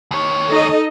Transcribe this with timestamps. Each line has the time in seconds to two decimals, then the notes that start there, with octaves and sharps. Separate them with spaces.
0.11 D#2 C#5
0.50 D#4 A4 D#5